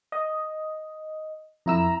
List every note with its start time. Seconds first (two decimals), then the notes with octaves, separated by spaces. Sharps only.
0.12 D#5
1.66 F2 E4 A#5 E6